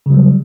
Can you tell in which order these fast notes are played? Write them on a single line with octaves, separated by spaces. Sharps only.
C#3 F#3 G3